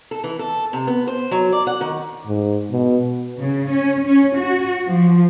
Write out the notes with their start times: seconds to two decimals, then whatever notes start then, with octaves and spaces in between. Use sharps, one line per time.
0.11 A4
0.24 E3
0.39 A4
0.73 C3
0.87 B3
1.07 C5
1.31 F#3
1.52 D5
1.67 F#5
1.81 D#3
2.27 G#2
2.71 B2
3.37 C#3
3.70 C#4
4.05 C#4
4.36 F#4
4.87 F3